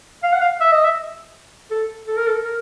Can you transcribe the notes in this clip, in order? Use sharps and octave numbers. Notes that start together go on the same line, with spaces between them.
F5
F#5
F5
E5
D#5
E5
A4
A4
A#4
A4
A#4